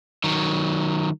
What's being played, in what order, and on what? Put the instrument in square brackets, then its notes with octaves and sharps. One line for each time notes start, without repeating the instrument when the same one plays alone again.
[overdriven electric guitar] D#3 F#3